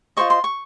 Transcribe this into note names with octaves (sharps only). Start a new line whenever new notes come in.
F4 G#4 C5 D#5 C#6
C6
C#6